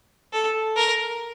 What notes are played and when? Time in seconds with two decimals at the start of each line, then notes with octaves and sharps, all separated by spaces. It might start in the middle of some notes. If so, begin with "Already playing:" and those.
0.33 A4
0.76 A#4